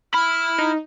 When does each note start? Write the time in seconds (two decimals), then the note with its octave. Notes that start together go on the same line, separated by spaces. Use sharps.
0.14 E4 B5 F6
0.59 D#4